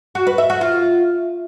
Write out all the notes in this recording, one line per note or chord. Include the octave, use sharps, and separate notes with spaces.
F#4
B4
E5
F#4
F4